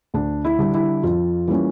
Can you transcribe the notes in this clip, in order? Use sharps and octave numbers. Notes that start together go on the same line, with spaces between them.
D2 D4
E4
D3 G3 D4
E4
F2 F4
E3 G3 A#3 C#4